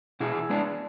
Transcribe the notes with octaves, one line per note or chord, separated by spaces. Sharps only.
B2 E4 G#4
G#3 B3 D4